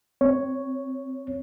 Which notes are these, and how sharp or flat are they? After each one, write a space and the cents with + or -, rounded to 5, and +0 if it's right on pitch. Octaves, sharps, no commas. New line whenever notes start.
C4 +0 C#5 +0